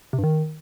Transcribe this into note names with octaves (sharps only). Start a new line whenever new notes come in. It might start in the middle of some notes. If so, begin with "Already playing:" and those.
C3
G2
D#3